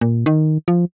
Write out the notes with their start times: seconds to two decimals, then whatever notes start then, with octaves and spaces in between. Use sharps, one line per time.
0.01 A#2
0.26 D#3
0.68 F3